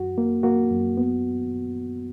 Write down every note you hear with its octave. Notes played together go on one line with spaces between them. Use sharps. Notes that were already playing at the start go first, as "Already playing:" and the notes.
Already playing: F#2 F#4
A#3
A#3 F#4
F#2
B3